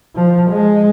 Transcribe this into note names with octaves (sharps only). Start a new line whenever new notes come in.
F3
G#3